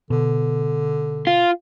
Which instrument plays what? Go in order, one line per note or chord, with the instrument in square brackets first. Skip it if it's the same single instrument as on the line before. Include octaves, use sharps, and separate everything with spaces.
[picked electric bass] B2 [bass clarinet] D3
[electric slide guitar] F4